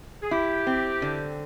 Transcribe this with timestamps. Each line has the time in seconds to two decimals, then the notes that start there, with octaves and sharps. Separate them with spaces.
0.23 G#4
0.31 E4 G4
0.67 C4
1.02 D3